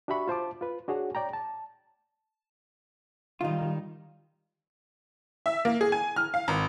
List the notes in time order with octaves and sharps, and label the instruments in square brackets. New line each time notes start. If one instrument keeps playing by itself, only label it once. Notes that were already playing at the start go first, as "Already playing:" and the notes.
[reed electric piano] D4 F#4 G4 E5 B5 C#6
F4 C5 A5 D6
F4 B4
D4 F#4 G#4 C#5 F#5
C#5 D5 G5 A#5
A5
[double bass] D#3 G3 [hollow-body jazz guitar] D#4 F4
[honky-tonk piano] E5
A#3
G#4
G#5
F6
F5
G#1